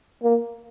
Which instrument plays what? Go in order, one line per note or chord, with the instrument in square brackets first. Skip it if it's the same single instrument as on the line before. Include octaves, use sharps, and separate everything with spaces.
[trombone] A#3